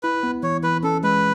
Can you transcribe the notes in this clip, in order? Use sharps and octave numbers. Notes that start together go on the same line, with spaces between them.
E4 B4
B3
E3 C#5
E3 B4
C#4 A4
G#3 B4